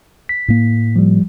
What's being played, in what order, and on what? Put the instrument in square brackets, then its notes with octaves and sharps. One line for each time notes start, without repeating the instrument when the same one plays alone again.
[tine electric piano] B6
[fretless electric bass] A2 A#3
[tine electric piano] F3 G3